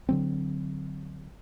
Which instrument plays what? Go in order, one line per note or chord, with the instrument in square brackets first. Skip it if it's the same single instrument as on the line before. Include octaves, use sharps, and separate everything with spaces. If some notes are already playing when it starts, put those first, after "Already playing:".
[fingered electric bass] D3 F#3 C4